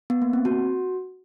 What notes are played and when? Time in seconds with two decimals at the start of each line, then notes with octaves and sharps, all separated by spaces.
0.10 B3
0.22 A#3
0.33 C4
0.45 F#4